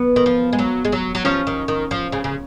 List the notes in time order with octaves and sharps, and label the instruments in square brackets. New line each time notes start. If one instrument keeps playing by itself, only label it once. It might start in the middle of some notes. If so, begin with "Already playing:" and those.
Already playing: [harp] B3
[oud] D#3
F3
G#3
F#3
G#3
F#3
F#3
[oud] F3 [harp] C#4
[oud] D#3
D#3
F3
C#3
C#3